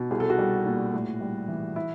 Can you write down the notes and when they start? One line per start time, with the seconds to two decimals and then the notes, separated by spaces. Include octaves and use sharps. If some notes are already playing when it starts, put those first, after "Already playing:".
Already playing: B2
0.11 C2 G#4
0.20 A4
0.29 F#4 G#4
0.39 G3
0.66 A#2
0.94 A2
1.21 G3
1.48 E3
1.76 E4